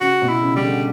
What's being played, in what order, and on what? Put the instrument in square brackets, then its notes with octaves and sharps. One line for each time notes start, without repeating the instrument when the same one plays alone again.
[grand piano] C#3 [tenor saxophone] F#4
[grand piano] B2
[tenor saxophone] E4
[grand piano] C#3
[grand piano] C#3 [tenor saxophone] G3
[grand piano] D3